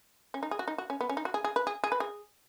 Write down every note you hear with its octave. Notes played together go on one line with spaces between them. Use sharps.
C#4
D#4
G#4
F#4
D#4
F#4
C#4
B3
C#4
D#4
F#4
G#4
G#4
B4
G#4
G#4
B4
G#4